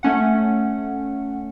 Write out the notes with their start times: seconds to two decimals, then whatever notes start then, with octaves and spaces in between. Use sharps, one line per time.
0.03 A3 C#4 F#5